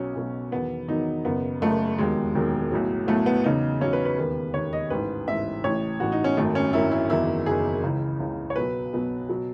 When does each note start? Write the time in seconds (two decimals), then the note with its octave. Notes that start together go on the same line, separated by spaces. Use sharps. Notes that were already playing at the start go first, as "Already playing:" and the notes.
Already playing: B1 B2 F#3 C#4
0.15 B1 B2 F#3
0.52 E2 D#3 F#3 B3
0.88 E2 D#3 F#3 D#4
1.25 F#1 F#2 C#3 B3
1.61 F#1 F#2 C#3 A3
1.98 E1 D#2 D#3 F#3 G#3
2.35 E1 D#2 D#3 F#3
2.71 B1 A2 F#3
3.07 B1 A2 F#3 A3
3.26 B3
3.44 E2 C#3 F#3 D#4
3.81 E2 C#3 F#3 C#4
3.93 B4
4.05 B4
4.17 E1 D#2 D#3
4.54 E1 D#2 D#3 C#5
4.73 D#5
4.90 A1 G#2 E3 B4
5.28 A1 G#2 E3 E5
5.64 A1 A2 E3 C#5
6.00 A1 A2 E3 F#4
6.12 D#4
6.24 C#4
6.37 G#1 F#2 D#3 F#3 A3
6.55 C#4
6.73 G#1 F#2 D#3 F#3 E4
6.91 E4
7.10 F#1 E2 D#3 F#3 E4
7.46 F#1 E2 D#3 F#3 G#4
7.83 C#2 C#3 E3
8.20 C#2 C#3 E3
8.50 C#5
8.56 B1 B2 F#3 B4
8.93 B1 B2 F#3
9.29 B2 F#3